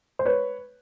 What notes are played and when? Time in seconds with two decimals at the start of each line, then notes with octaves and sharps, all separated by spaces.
0.19 C5
0.26 B4 C#5